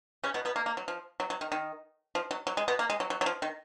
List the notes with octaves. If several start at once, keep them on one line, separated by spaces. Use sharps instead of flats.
C#3 C#4
B2 B3
B2 B3
A#3
A#3
F#3
F3
F#3
F#3
D#3
D#3
F3
F#3
F#3
G#3
B2 B3
A#3
G#3
F#3
F#3
F#3
F3
D#3